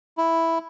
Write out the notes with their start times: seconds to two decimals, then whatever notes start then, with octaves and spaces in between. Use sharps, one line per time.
0.18 E4